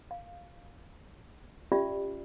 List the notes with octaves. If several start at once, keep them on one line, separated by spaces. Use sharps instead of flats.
F5
C#4 F4 G4 D5 E5